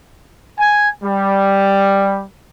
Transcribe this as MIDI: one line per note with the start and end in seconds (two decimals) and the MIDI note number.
0.59 0.90 80
1.03 2.25 55